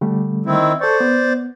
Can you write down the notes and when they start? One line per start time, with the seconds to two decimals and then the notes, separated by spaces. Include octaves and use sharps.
0.01 D3 G3 A3
0.46 D#3 C4 E4
0.81 A4 C5 D5 C#6
1.00 B3